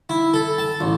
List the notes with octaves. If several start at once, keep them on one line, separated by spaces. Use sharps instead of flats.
E4
A4
A5
A1